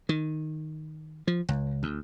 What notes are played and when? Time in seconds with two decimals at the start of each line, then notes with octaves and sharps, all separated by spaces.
0.09 D#3
1.27 F3
1.49 C#2
1.83 D2